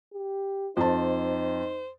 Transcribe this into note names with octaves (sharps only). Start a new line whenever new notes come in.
G4
F2 D#4 C5 A5